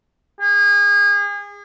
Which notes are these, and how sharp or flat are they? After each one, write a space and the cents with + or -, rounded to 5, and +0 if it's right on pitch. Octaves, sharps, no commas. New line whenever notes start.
G#4 -35